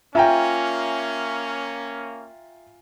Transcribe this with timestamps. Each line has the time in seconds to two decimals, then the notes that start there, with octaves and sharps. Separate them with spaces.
0.15 A#3 C#4 F4 E5 G5 G#5 A#5